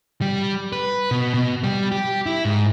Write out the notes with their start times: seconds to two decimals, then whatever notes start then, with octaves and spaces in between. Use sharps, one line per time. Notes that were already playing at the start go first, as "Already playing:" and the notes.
0.21 G3
0.72 B4
1.11 B2
1.34 B2
1.63 G3
1.92 G4
2.26 E4
2.45 G#2